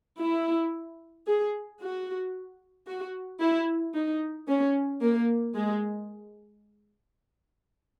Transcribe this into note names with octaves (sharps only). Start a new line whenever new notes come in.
E4
G#4
F#4
F#4
E4
D#4
C#4
A#3
G#3